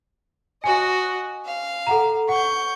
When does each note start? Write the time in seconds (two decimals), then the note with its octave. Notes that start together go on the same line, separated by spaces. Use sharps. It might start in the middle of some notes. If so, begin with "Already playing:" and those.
0.64 F#4 D#5 G#5
1.45 F5
1.87 A4 F#5 A#5
2.29 F#5 C#6 G6